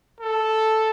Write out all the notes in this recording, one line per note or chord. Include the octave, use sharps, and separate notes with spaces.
A4